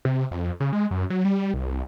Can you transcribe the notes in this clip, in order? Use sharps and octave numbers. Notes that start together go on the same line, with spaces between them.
C3
F2
C#3
G#3
F#2
F#3
G3
C2